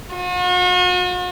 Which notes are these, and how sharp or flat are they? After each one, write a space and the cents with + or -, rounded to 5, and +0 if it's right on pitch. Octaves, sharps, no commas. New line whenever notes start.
F#4 -45